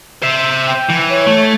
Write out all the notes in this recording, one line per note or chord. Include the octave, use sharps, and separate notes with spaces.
C5 E5
G5
E3
C#5
A3